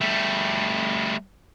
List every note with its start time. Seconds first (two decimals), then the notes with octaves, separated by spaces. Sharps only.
0.01 G3 A3